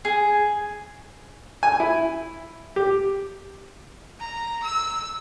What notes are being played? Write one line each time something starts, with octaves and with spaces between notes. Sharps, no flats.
G#4
G#5
E4
G4
A#5
E6